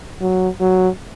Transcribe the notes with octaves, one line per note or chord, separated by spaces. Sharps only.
F#3
F#3